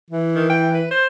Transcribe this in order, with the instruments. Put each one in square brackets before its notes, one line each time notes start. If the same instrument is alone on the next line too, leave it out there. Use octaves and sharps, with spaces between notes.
[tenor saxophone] E3
[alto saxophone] D#3
G5
B4
C5